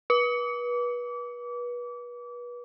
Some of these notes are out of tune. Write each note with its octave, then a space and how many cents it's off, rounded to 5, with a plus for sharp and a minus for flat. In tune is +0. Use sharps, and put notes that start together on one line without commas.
B4 -30 D6 -30